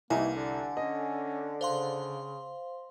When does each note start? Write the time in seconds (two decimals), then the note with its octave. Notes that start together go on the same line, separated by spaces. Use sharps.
0.10 C2 D#3 E3 A#3 G#5
0.36 D3 A4
0.77 C#4 D#5
1.61 C#3 C5 F5 C6